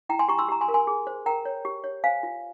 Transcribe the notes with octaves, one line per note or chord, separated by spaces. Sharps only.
E4 G5 A#5
G#5 C6
G4 A#5 C#6
C6 E6
G4 A#5
G#5 C6
A#4
G#5 C6
G#4
C5
A#4 G5 A#5
C#5
G4
C#5
C5 F5 G#5
F4